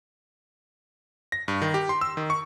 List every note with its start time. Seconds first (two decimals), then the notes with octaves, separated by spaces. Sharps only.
1.32 A#6
1.48 G2
1.62 D#3
1.74 G4
1.89 C6
2.01 E6
2.17 D#3
2.30 C#6